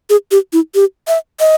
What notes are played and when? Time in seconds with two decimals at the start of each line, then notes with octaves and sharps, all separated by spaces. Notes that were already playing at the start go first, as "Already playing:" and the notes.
0.10 G#4
0.31 G4
0.53 E4
0.75 G4
1.08 E5
1.40 D#5